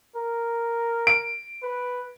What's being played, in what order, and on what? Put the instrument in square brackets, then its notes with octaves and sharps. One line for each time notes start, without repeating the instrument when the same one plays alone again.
[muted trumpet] A#4
[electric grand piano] D7
[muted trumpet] B4